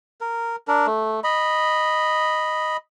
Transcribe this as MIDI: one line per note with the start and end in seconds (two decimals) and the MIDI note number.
0.21 0.56 70
0.68 0.86 62
0.68 0.86 70
0.86 1.20 57
1.24 2.77 75
1.24 2.77 83